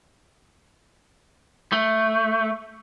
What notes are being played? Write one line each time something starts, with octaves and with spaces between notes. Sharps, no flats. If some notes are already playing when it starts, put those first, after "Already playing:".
A3